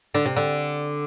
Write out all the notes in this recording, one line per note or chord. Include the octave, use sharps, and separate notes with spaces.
D3
C3
D3